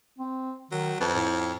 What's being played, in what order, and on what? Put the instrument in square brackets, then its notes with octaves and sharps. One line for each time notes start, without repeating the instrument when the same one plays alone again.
[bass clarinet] C4
[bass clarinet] D#3 [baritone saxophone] F#3
[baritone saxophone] F2 [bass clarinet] B4
[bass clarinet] A2